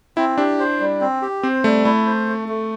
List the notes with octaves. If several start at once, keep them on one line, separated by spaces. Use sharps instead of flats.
C4 E4
D4 G4
C5
G3
C4
G4
C4 C5
G3 A3
A3 E4
C5
A3
A3